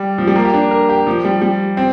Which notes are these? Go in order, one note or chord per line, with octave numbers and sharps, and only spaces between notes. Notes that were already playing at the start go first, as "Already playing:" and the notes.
Already playing: G3
F3
G3
A#3
G4
D4
A#4
G4
F3
G3
G3
C4